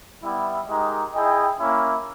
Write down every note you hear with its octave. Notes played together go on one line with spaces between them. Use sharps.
G3 B3 E4
G#3 D#4 G4 A#4 D#5
E4 G#4 D#5 G5
A#3 C#4 E4